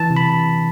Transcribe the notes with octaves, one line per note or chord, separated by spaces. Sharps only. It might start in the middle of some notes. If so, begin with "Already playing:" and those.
Already playing: E3 A5
C3
B5